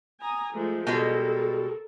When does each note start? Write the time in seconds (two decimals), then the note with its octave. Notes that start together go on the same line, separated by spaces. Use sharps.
0.20 G#5 A#5 D#6
0.52 F3 G#3 A3
0.87 B2 G3 G#3 A4 A#4